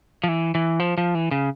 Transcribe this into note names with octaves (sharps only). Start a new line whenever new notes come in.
F3
E3
E3
F3
F3
E3
C#3